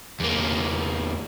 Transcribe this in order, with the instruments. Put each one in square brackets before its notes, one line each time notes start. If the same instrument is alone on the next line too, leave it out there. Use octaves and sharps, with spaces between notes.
[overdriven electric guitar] E2 A#3